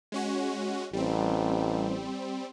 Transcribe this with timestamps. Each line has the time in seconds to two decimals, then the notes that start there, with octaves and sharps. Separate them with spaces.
0.12 G#3 C#4 F#4
0.93 A1 G3 C4